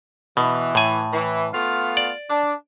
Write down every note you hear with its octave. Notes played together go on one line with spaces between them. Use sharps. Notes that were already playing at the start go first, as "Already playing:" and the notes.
B2 E3
A2 G#5
E3
A3 B3 F4
D5
D4